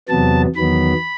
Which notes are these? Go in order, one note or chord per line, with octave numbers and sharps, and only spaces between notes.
E2 C3 F#3 B3 A5
E2 D#3 F#3 B3 B5